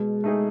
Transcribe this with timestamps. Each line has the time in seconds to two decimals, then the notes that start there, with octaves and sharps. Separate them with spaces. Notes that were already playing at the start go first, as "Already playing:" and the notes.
Already playing: B2 G#3
0.24 A3 D#4 G#4